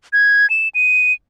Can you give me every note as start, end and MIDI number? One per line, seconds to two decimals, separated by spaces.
0.13 0.49 92
0.50 0.69 100
0.75 1.13 99